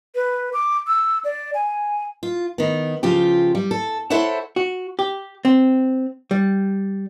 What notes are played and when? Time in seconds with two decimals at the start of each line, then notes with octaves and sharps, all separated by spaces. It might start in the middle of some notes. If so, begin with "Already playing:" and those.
0.15 B4
0.53 D6
0.87 E6
1.24 D5
1.54 G#5
2.23 F4
2.58 D#3 B3
3.03 C#3 F3 F4 G4
3.55 G3
3.71 A4
4.10 E4 A4 C5 C#5 E5 F#5
4.56 F#4
4.99 G4
5.45 C4
6.31 G3